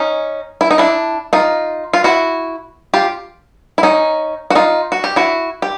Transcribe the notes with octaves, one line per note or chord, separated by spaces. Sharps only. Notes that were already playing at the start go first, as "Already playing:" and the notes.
Already playing: C#4 D#4
E4
D#4
D4 E4
D#4 F4
F4
E4 F#4
F4 G4
E4
C#4 D#4
F#4
D#4 F4
F#4
G4
E4 F#4
G4